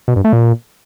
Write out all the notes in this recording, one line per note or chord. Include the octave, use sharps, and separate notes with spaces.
B2
G2
A3
A#2